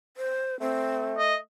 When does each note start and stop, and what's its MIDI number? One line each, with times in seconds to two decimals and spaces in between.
0.17 0.59 72
0.60 1.37 57
0.60 1.13 60
1.18 1.36 75